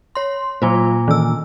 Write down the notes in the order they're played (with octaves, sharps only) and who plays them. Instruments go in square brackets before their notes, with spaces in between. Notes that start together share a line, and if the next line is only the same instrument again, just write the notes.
[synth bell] C#5 C6
[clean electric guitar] A#2 [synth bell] F#3 F4 C5
[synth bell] D#3 E3 E6